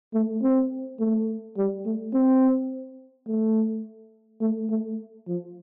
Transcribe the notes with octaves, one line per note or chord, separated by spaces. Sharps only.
A3
C4
A3
G3
A3
C4
A3
A3
A3
F3